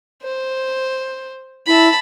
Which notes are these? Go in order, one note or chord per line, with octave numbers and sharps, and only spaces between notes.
C5
E4 A5 B5